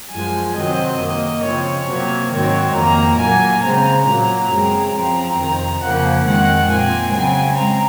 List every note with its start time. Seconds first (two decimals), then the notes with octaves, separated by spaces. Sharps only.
0.11 F#2 F3 G#3 G#5
0.55 C3 D#3 F#3 C4 D#5
0.99 F#2 D#3 A#3
1.43 C#3 F3 C4 C#5
1.86 C3 F#3 A#3
2.31 G#2 D#3 F#3 C4 C#5
2.74 F2 D#3 A#3 A#5
3.19 A#2 F#3 A#3 G#5
3.62 C#3 G#3 C4 A#5
4.07 A#2 F#3 A#3
4.50 F#2 C#3 G#3 C4
4.94 F#2 F3 C4 A#5
5.38 F2 C3 D#3
5.82 F2 C#3 F3 A#3 F#5
6.26 F2 D#3 G#3 C4 F#5
6.70 A#2 G#3 C4 G#5
7.14 C#3 F#3 C4 G#5
7.58 G#3 C4 A#5